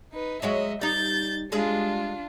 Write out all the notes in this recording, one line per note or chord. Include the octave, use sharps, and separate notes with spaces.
D#4 B4
F#3 G#3 F#4 D#5 E5
G3 D#4 G6 A6
G3 G#3 D4 F4 G#4